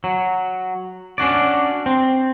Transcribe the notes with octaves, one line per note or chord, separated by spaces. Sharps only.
F#3
C#4 D4 F#4 D5
C4